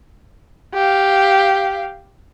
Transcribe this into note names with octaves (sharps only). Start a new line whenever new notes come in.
G4 F5